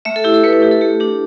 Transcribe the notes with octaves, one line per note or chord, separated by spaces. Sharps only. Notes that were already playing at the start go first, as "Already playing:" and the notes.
A3 E5
A4
E4 G4
A4
A3 B4
A4
E4 G4
A4
A3 G4
D4 G4